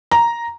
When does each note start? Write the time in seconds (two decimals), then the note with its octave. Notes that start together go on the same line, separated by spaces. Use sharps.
0.11 A#5